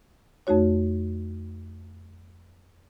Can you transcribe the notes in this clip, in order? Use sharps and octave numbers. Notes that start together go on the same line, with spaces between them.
F2 A3 D#4 F#4 C#5